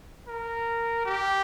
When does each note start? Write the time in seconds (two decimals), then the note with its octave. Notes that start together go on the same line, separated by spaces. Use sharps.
0.28 A#4
1.06 G4